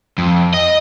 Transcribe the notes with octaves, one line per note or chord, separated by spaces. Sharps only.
F2
D#5